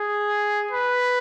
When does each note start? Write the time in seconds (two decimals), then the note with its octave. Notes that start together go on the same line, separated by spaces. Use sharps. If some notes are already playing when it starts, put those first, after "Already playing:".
Already playing: G#4
0.71 B4